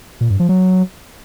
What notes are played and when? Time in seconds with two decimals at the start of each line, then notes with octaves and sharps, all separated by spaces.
0.21 A#2
0.30 G2
0.40 F3
0.49 F#3